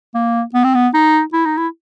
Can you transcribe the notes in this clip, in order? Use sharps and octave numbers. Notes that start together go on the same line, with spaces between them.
A#3
B3
C4
B3
D#4
E4
D#4
E4